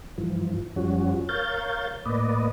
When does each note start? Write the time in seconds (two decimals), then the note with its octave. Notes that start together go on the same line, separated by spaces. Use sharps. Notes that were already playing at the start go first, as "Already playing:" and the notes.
0.18 G2 E3 F3
0.76 F#2 F3 G3 C#4 F#4
1.29 A#4 C#5 F5 G6 A6
2.06 A2 A#3 B4 D5 D#5